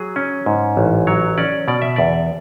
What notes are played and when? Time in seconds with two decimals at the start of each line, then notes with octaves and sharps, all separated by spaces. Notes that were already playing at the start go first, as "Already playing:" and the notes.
Already playing: F#3 G#4
0.16 C#4
0.46 G#2
0.77 A1
1.07 F#3 C#5
1.38 C#4 D5
1.68 B2 D5
1.82 E5
1.96 E2 D5